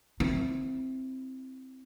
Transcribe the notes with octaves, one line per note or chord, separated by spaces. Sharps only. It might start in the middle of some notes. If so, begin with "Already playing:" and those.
C4 E4